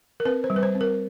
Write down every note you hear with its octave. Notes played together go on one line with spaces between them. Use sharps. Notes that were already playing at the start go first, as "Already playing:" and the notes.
A#4
C4 B4
C5
G3
B4
C5
C4
A#4